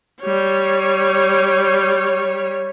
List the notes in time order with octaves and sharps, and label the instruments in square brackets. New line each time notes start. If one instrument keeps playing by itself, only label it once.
[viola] G3 C#5